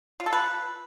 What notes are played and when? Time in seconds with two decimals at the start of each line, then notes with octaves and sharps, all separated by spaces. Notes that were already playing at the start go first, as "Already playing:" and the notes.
0.20 F4
0.26 A4
0.33 B4